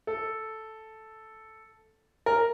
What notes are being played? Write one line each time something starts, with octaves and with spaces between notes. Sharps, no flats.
A4
A#4